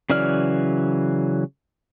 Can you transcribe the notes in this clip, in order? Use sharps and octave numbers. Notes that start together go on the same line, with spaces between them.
C#3 E3 F#3 D5 F6